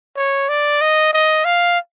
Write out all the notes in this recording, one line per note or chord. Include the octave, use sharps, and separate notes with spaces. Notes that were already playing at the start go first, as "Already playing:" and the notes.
C#5
D5
D#5
D#5
F5